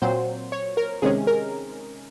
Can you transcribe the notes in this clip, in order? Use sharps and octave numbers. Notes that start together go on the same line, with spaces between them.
A#2 F#3 C4 C5
C#5
A#4
C3 D#3 G#3 C#4 G#4
A#4